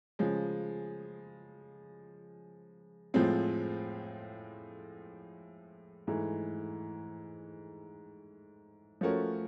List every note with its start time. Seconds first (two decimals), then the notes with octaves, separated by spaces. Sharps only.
0.19 C#3 F3 G#3
3.14 A2 F3 G#3 C4 F4
6.07 G#2 E3 A3
9.01 F3 A3 C#4 F#4 A#4